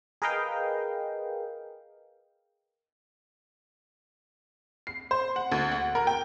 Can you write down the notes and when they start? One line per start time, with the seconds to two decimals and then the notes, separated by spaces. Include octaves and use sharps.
0.22 G#4 A#4 B4 D#5 F5 G5
4.87 C7
5.11 C5
5.36 F#5
5.52 D2
5.72 F#5
5.95 A#4
6.07 G5